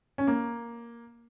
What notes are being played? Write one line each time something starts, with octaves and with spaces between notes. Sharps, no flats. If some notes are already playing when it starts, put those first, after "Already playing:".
C#4
A#3